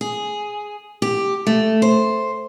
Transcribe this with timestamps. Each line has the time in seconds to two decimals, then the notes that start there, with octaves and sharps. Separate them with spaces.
0.01 G#4
1.02 G4
1.47 A3
1.82 C5